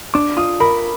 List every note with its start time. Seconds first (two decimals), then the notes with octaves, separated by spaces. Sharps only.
0.14 D4 D6
0.37 F4 D#6
0.60 A#4 B5